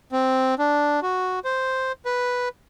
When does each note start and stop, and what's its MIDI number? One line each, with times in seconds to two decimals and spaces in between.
0.12 0.55 60
0.59 1.00 62
1.02 1.39 66
1.45 1.92 72
2.05 2.49 71